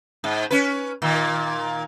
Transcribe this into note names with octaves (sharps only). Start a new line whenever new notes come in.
G#2
C#4 B4
A#2 D#3